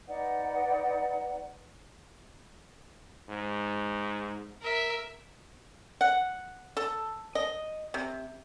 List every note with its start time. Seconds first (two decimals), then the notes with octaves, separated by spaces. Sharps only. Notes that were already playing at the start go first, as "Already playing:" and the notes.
0.07 D#4 B4 D5 F#5
3.29 G#2
4.62 A#4 E5
6.01 F#5
6.77 A4
7.35 D#5
7.94 C3